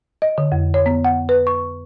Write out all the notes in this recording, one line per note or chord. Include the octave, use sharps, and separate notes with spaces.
D#5
D3
F2
C#5
B3
F#5
B4
C#6